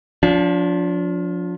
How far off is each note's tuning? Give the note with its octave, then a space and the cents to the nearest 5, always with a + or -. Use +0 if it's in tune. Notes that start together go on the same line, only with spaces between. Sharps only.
F3 +25 D4 -30